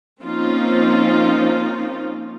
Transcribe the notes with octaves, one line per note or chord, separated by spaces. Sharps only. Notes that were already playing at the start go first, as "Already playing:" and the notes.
F3 A#3 C4 C#4 D#4 F4